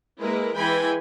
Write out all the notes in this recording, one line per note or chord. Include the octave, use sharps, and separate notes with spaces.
G#3 A#3 E4 A#4 B4
E3 G#3 G5 G#5 B5